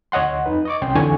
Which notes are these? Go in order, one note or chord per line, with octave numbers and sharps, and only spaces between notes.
D2 C#5 D#5 F#5 C6
F2 D#4 B4
D#5 C#6 D6
C2 C#4 G5 C6
F2 D3 E3 D5 G#5 C#6